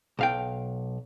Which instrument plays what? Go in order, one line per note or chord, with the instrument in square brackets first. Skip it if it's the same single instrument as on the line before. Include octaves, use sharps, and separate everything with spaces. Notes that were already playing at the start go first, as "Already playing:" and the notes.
[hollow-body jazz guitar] B1 F5 G5